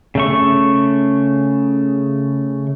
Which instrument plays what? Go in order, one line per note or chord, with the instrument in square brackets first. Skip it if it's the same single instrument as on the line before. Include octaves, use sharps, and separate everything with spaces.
[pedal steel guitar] C#3 A3 C#6